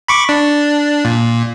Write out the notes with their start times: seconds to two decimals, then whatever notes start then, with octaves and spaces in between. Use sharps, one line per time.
0.08 B5 C#6 D6
0.29 D4
1.05 A#2